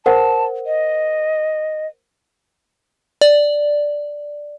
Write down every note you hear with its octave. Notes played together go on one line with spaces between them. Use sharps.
A#4 C5 F#5 A5
D#5
D5